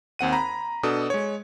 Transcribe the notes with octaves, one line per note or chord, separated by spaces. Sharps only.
D#2 C4 F#5 D#7
A#5 B5
B2 D4 A4 D#6
G#3 C#5